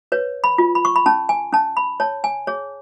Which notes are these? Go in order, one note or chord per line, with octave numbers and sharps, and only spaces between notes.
B4 C#5
B5
F4
B5
C#6
B5
C#4 A5
G#5
C#4 A5
B5
C#5 A5
G#5
G#4 C#5